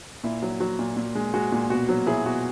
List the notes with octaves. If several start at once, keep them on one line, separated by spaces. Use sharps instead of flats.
A#2 E4
F#3
F#3 F#4
A#2
A#2
G#3
G#3 F#4
A#2
B2 F#4
F#3
F#3 E4 G#4
B2 F#4